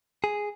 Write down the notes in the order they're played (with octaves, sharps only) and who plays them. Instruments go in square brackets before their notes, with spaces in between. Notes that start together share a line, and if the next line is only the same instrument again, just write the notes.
[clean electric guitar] G#4